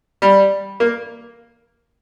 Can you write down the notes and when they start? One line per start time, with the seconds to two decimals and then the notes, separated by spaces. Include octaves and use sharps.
0.22 G3
0.80 A#3